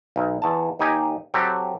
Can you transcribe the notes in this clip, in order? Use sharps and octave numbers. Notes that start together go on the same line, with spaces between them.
B1
E2 A5
D#2 D#4 G4 G#5
F#3 C4 G4 A4